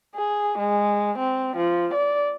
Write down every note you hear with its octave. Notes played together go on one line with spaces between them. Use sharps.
G#4
G#3
C4
F3
D5